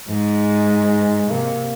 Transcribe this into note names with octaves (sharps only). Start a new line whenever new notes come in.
G#2 G#3
C3 A#3